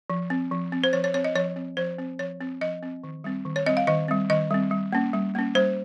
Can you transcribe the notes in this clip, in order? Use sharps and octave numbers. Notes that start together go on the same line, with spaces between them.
F3
C4
F3
C4
C5
F3 C#5
C#5
C4 C#5
D#5
F3 C#5
C4
F3 C5
C4
F3 C#5
C4
F3 D#5
C4
D#3
G3 C4
D#3
C#5
G3 C4 D#5
F5
D#3 D#5
G3 C4
D#3 D#5
G3 C4
G3
A#3 C#4
G3
A#3 C#4
G3 C5